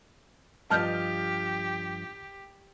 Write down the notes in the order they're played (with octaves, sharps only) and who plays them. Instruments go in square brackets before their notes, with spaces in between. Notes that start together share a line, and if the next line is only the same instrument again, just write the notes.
[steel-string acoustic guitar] G2 F3 D#5 [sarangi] G4 [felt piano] A5 F6 G6